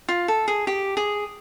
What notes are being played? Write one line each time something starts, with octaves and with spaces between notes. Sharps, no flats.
F4
A4
G#4
G4
G#4